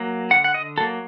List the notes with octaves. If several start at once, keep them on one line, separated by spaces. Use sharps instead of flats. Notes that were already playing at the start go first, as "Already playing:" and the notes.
Already playing: F#3 A#3
D3 F#5
F#5
D#5
F#3 A#3 A4